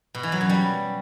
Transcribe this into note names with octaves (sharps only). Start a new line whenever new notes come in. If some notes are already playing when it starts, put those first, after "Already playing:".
B2
E3
F#3
F#2
G3